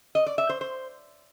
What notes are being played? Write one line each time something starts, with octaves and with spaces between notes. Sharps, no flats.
D#5
D5
E5
C5
C5